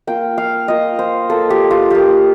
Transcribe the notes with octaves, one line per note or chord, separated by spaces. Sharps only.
A#3 F4 G5
F5
A#3 F4 D#5
C5
A#3 F4 A4
G4
F4
A#3 F4 G4